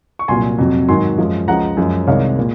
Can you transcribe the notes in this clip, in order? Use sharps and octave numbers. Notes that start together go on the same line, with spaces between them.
C#6
C2 A#2 F#3 G#5 C6
F2 C3 F#3
G#2 D#3 F#3 G#5 C6
F#2 F3 G#3
C#2 C#3 F3 G#3 F#5 A#5
F#2 F3 G#3
C2 C3 D#3 G#3 C#5 F5
A#2 G#3